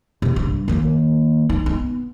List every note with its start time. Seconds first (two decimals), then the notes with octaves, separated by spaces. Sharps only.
0.22 C3
0.36 G2
0.68 D#3 A#3
1.50 D#4
1.66 B3